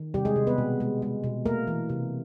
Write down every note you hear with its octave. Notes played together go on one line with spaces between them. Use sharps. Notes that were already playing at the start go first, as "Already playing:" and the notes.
Already playing: D#3
C3 G3 G4
G#3 G#4
C3
B3 B4
B2
G#3
G#3
B2
A3 A#3 A#4
E3
C3